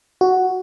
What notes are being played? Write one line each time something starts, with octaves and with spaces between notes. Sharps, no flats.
F#4